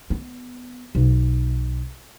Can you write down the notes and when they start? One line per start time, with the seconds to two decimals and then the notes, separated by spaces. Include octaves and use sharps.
0.10 B3
0.95 B1